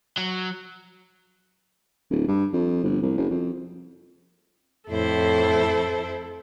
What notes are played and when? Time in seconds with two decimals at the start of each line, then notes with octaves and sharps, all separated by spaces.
0.17 F#3
2.11 D1
2.28 G2
2.53 F2
2.84 G1
3.02 C2
3.17 F#1
3.30 F2
4.90 F2 A2 E4 A4 C5